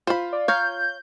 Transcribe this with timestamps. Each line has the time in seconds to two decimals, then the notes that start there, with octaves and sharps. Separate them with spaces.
0.07 F4 C5 B5
0.32 D5
0.48 C#5 F5 A#5 G6